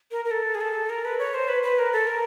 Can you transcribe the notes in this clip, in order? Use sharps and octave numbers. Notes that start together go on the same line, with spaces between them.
A#4
A#4
A4
G#4
A4
A#4
B4
C#5
C5
B4
B4
A#4
A4
A#4